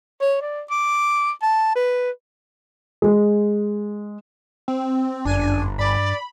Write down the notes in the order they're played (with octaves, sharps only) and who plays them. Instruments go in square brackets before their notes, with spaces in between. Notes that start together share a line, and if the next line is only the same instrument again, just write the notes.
[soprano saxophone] C#5
D5
D6
A5
B4
[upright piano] G#3
[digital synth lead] C4
[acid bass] G1 [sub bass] F#2 [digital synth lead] D4 [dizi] G#5
[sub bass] G2 [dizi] D5 [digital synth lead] B5